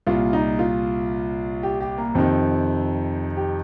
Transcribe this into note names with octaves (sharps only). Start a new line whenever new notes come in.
C2 A#2 F4
D#4
F4
G4
G4
A#3
F2 C3 D#3 C4
G4